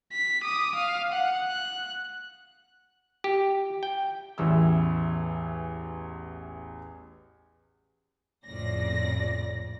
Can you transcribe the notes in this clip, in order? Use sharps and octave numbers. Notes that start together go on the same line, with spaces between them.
B6
D6 D#6
F5
F#5
F#6
G4
G5
A1 E2 E3 E4 E6
A#1 F2 A2 C#3 D5 A#6